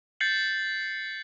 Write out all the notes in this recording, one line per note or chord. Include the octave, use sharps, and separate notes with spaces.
G6 A6 C7 C#7 F#7